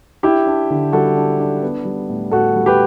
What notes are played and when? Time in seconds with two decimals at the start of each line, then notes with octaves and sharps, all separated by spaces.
0.23 D4 E4 G4
0.47 D4
0.70 D3
0.93 G3 F#4 A4
1.17 D4
1.39 D4
1.62 B3
1.85 G3
2.09 A2
2.31 A2 F#4 A4
2.56 G3
2.66 G4 B4